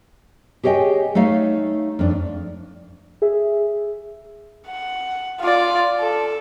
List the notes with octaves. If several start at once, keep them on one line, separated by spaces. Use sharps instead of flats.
G4 G#4 C#5 D#5 G5 G#5
A3 D#4 C#5 F5
F2 D4
G#4 E5
F#5
F4 D5
A4